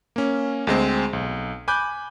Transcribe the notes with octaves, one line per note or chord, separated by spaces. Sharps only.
A#3 C#4
D2 G#3 C4
B1
G#5 B5 D6 F#6 G6